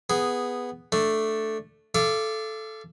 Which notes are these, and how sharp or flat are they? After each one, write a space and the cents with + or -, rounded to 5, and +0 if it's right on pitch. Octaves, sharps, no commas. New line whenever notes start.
B3 +0 G#4 -5
A3 +0 D4 +0
A4 -10 F5 -40 D6 +0